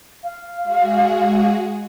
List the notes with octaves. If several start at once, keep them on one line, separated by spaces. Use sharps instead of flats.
F5
G#3 F#4 G#4